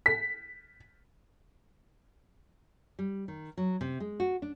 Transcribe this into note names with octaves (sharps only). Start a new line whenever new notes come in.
B6
G3
D#3
F#3
C3
G#3
F#4
D4